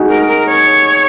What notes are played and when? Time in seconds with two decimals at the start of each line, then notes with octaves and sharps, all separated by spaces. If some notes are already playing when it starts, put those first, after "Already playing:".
Already playing: D#4 F#4 G#4
0.09 A#4
0.27 A#4
0.46 C#5